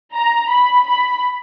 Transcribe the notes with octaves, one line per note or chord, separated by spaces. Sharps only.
A#5
B5
B5